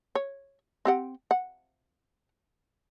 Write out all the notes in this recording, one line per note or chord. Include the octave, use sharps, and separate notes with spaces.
C#5
C4 G4 F#5
F#5